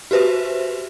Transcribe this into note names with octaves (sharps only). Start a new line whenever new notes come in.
F#4 G4 B4 C5 E5